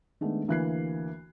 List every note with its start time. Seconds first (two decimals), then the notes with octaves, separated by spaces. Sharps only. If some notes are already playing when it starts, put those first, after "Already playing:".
0.21 D#3 G#3 A3 B3 D4
0.48 D2 E3 A#3 F#6 G#6 C7